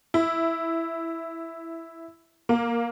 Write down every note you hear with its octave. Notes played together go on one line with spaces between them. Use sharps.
E4
A#3